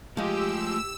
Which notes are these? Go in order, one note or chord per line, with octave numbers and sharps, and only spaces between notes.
F3 G#3 A3 G4 G#5 E6